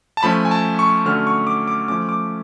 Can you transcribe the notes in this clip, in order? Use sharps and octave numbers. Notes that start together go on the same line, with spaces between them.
A5
F3 A3 C#4 B5
G#5
A5
C#6
D3 F#3 A3 C#4 F6
C#6
D6
D6
F3 A3 C#4 D6
D6